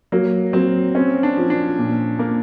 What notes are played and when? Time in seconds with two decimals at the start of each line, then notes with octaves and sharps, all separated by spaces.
0.12 F#3 A#3
0.53 F#3 C4
0.95 C4 C#4
1.23 D4
1.37 F3
1.50 D4
1.78 A#2
2.19 A#3